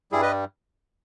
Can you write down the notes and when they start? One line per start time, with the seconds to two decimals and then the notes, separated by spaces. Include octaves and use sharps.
0.12 G2 G3 E4 G#4
0.22 B4 D#5